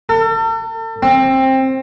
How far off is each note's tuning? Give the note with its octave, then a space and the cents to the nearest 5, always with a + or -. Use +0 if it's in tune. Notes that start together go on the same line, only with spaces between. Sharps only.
A4 +40
C4 +20